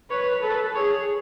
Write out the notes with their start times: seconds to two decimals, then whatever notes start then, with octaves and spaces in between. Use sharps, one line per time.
0.10 B4 C#5
0.42 A4 B4
0.75 G#4 C#5